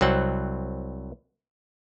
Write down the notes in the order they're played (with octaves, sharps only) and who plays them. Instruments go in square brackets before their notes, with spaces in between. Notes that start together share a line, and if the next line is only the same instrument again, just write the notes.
[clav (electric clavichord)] C2 F#3 C4 F#5